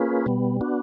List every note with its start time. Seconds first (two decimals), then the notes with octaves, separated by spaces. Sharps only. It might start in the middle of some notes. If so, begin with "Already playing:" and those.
Already playing: A#3 C#4 F4 G#4 B4
0.26 B2 G3 B3
0.61 B3 D4 F#4